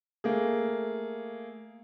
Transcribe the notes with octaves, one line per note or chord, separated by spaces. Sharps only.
A3 A#3 G#4